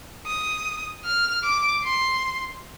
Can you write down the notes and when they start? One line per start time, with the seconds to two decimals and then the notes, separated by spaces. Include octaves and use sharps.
0.26 D#6
1.04 F6
1.44 D6
1.84 C6